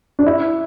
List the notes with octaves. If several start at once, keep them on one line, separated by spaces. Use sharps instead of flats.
D4
E4